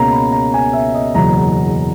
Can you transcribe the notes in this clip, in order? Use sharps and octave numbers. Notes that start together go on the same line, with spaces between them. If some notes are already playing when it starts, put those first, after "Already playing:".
Already playing: C#2 B2 A#3 C#4 A#5
B5
A#5
G#5
E5
D#5
F#1 E2 B2 F#3 A#5